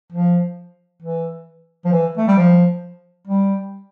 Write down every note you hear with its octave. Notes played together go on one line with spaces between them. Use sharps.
F3
E3
F3
E3
A3
G3
F3
G3